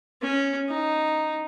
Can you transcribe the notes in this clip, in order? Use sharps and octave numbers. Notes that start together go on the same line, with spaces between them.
C#4
D#4